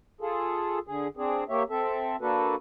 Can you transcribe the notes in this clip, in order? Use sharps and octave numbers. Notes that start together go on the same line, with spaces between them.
F4 G#4 A4
D3 G#4
C4 D4 G#4
A#3 G4 C#5 E5
C4 A4 E5
A#3 D4 F#4 A4 B4